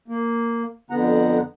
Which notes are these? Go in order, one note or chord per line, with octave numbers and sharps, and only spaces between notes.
A#3
F2 D3 B3 F#5 A#5